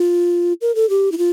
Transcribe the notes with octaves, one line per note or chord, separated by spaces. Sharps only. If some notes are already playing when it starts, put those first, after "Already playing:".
Already playing: F4
A#4
A4
G4
E4
F4